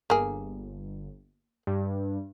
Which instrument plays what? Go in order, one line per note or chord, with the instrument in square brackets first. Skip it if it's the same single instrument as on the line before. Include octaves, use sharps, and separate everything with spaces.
[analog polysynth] G1 [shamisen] A#3 G#4
[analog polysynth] G2